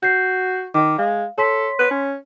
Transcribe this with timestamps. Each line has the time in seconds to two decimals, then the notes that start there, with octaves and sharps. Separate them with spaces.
0.03 F#4 G6 C7
0.74 D#3 D6
0.98 G#3 F5
1.38 A4 C#5 C6 B6
1.79 B4
1.90 C#4